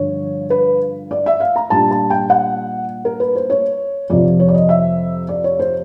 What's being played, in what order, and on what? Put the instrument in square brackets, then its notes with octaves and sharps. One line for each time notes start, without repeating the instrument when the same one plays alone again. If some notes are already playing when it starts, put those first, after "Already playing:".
Already playing: [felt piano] G2 D3 F3 C#5
B4
D5
E5
F5
A#5
A#2 G3 A#3 D4 A5
A5
G5
F#5
A#4
B4
C5
C#5
F2 C3 F3 D5
C#5
D5
D#5
E5
D5
C#5
C5